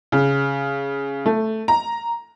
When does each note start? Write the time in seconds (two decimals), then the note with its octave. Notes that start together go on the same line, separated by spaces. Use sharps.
0.12 C#3
1.26 A3
1.68 A#5